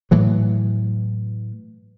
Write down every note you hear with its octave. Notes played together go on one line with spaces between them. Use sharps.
A2 E3 F#3